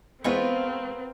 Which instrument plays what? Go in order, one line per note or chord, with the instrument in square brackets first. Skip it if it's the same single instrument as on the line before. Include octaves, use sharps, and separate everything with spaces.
[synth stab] E2 G#3 C#6 [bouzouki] B3 F4 A#4 [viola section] C4